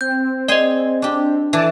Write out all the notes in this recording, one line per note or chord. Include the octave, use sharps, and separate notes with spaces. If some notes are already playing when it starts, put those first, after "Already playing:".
C4 G6
G#4 C5 D5 D#5 G#5
D4 G4
E3 A4 D5 A5